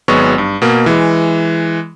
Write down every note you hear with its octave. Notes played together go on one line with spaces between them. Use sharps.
G#1 F#3 G#3 B3 C#6
G2
B2 A#3
E3 G#3